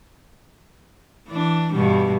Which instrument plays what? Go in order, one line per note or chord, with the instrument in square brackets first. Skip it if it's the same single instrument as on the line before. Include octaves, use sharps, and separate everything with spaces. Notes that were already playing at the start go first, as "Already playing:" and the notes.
[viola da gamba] E3 D4
G2 B2 G3